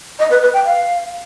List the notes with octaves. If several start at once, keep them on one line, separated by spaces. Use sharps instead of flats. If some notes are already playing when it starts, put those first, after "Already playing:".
D#5
B4
B4
G5
F5